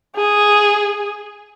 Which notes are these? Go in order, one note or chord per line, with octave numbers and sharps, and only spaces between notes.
G#4